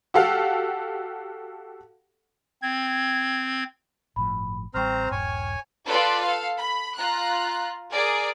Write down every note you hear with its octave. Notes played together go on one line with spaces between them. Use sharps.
F#4 G4 A4 F5 F#5
C4 G#6
G1 A2 F3 B5
A1 G3 C4 C5 G5 A#5 C#6 F6
D#1 G2 C#5 G#5
F4 A4 B4 D5
A4 F5
B5
F4 A#5 F#6
G#4 A#4 D5